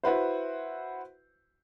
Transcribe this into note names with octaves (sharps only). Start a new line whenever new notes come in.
E4 F#4 B4 C5